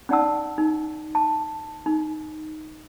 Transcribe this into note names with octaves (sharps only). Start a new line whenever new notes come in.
C#4 D#4 D5 F#5 A5 E6
D#4
A5
D#4